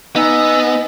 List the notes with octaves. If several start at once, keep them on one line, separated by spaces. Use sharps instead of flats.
B3 D#4 G#5 E6